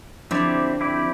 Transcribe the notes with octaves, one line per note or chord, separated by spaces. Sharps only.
D3 F3 C4 E4 G4 D5
C4 E4 G4 D5